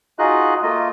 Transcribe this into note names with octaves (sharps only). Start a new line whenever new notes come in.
D#4 F4 F#4 G#4 D#5 F#6
A3 A#3 F4 D#5